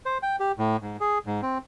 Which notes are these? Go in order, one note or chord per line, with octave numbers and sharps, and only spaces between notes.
C5
G5
G4
A2
G#2
G#4
G#2
C4